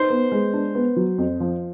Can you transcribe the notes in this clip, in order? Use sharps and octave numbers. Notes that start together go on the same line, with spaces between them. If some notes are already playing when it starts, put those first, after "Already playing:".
Already playing: D#4 C5
B3
G#3
D4
B3
F#3
F2
F3